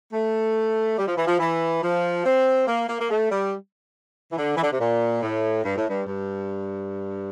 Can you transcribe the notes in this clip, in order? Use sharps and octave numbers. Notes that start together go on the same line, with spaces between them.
A3
G3
F3
E3
F3
E3
F3
C4
A#3
A#3
A#3
A3
G3
E3
D3
E3
D3
C3
A#2
A2
G2
A2
G2
G2